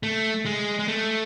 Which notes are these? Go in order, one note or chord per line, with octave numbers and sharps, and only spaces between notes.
A3
G#3
G#3
A3